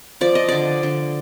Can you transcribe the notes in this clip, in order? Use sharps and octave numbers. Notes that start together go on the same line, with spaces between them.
F3 D5
D#5
D3 D5
D3